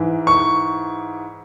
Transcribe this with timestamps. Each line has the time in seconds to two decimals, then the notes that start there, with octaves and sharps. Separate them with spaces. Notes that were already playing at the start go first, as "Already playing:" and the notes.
Already playing: G#2 E3
0.27 C#6